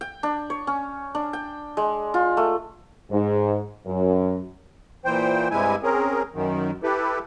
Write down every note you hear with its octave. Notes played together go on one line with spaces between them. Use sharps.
G5
D4
C#5
C#4
D4
G5
G#3
F4
A3
G#2
F#2
A#2 E3 C5 G5
G2 C3 G#3 E4 G#5
C4 C#4 G#4 A#4
F#2 D#3
E4 G4 A4 B4